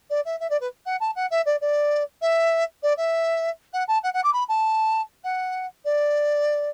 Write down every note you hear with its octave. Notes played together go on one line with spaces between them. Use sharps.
D5
E5
E5
D5
B4
F#5
A5
F#5
E5
D5
D5
E5
D5
E5
F#5
A5
F#5
F#5
D6
B5
A5
F#5
D5